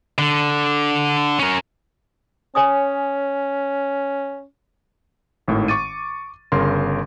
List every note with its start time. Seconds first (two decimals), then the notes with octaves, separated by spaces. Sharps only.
0.18 D3
1.39 C#4 A#4
2.55 C#4 C#5 G#5 D#6
5.48 G#1 A2 D#3
5.68 C#6 D6 A6 D#7
6.52 G1 C#3 A#4 C6